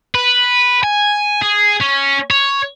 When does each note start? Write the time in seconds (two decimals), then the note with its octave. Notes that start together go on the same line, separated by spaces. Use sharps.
0.15 B4
0.83 G#5
1.42 G#4
1.80 C#4
2.31 C#5